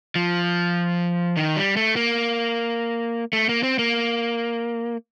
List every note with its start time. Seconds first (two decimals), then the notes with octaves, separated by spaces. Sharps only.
0.16 F3
1.37 D#3
1.56 G3
1.77 A3
1.96 A#3
3.33 A3
3.49 A#3
3.63 C4
3.79 A#3